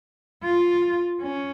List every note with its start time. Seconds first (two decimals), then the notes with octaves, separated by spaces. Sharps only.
0.44 F4
1.22 C#4